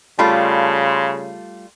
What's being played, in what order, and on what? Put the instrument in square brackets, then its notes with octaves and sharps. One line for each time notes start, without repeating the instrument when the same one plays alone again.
[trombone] C#3 [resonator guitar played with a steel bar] G3 A3 F4 [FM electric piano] A5 B5 C6